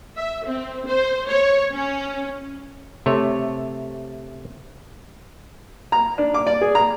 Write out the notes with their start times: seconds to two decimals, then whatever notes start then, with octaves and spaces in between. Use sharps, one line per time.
0.17 E5
0.47 C4
0.87 C5
1.29 C#5
1.75 C#4
3.06 C3 A3 C#5
5.92 A#5
6.18 D4
6.34 D6
6.47 D5
6.61 G#4
6.75 A#5